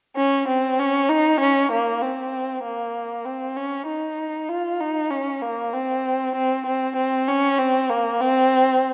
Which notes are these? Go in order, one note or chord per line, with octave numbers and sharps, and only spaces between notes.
C#4
C4
C#4
D#4
C#4
A#3
C4
A#3
C4
C#4
D#4
F4
D#4
C#4
A#3
C4
C4
C4
C4
C#4
C4
A#3
C4